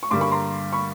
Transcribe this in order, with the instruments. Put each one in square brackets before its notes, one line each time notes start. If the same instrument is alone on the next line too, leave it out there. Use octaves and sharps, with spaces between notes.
[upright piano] C#6
G2 D3 G3 A#3 C6 D6
B5 C#6
A#5 C6
B5 C#6